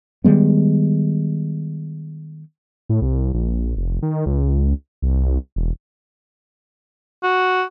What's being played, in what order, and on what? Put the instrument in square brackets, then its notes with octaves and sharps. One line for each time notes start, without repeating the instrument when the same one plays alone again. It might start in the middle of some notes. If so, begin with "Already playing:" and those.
[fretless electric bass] D#3 G3 G#3 B3
[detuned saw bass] A2
C2
A#1
F1
D#3
C#2
C2
E1
[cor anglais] F#4